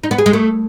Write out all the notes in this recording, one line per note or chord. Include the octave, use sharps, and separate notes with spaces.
D#4
B3
G#4
G#3
A3